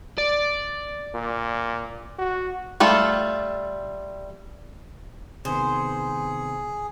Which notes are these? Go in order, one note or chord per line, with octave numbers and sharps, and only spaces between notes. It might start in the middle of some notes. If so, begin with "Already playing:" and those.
D5
A#2
F#4
G3 A3 F4 A4
C3 D#3 B3 G#4 C5